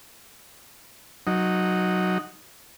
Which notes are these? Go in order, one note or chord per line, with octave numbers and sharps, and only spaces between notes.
F#3 D#4